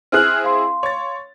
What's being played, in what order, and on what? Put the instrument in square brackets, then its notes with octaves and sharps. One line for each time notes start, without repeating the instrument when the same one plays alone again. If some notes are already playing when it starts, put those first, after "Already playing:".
[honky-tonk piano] C4 E4 G#4 [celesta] F6 F#6 F#7
[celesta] F5 C6
[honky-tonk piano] C#5 A6